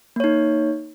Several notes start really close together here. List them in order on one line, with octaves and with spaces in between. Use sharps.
A#3 C#5 D#4